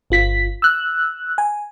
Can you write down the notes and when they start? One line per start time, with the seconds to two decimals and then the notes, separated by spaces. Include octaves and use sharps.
0.10 G1 F4 B6
0.62 E6 F#6
1.38 G#5